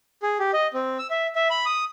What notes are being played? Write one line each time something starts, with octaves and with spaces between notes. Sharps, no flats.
G#4
G4
D#5
C4
E6
E5
E5
B5
D#6